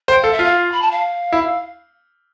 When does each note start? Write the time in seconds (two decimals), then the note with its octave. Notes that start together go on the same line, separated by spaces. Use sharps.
0.08 C5 G5
0.20 A4 F5
0.31 E5
0.39 F4 F5
0.71 B5
0.81 A5
0.91 F5
1.33 E4